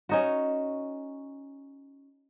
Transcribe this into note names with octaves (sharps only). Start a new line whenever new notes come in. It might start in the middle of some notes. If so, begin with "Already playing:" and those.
C#4 D#4 F#4